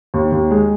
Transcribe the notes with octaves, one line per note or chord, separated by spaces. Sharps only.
D#2
D#2
G#3